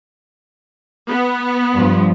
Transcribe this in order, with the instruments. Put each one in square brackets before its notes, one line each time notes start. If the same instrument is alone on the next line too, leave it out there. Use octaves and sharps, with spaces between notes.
[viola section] B3
[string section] G2 F3